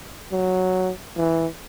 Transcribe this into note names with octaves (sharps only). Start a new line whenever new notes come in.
F#3
E3